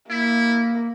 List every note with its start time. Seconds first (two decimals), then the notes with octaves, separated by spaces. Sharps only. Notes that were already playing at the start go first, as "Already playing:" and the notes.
0.10 A#3 E4